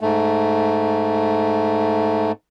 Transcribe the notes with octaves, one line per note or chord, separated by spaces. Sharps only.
G#2 A3